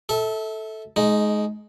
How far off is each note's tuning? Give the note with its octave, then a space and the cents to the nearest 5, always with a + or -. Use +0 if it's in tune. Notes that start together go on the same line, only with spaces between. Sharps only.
A4 +0 E5 -30
G#3 +30 D#4 +0